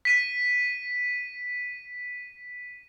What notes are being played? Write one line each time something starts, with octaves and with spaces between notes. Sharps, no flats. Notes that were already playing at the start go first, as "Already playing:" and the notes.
B6 D#7